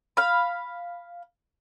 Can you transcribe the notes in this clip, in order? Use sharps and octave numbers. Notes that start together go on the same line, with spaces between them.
F5 B5